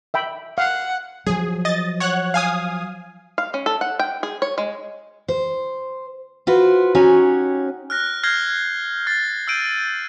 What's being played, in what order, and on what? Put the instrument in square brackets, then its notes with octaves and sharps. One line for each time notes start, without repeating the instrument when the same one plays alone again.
[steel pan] E5 G5 B5
[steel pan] F5 [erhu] F#5
[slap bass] F3 F#3 [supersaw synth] G#4
[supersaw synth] D#5 A6
C#5 F#5 F#6
F5 G#5 D#6
[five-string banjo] F5
C#4
A4
F#5
G5
G#4
C#5
G#3
[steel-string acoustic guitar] C5
F4 F#4 B4 C5
C#4 D#4 F#4 G4 C#5 G#5
[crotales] F6 F#6 A#6
F6 G6 G#6 A#6 C7 G7
F6 A6 C7
E6 F6 G6 D7 D#7